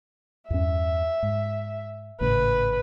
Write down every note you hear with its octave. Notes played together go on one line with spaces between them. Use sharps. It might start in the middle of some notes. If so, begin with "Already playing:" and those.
E2 G2 C#4 E5
G#2
G#1 A2 C#3 B4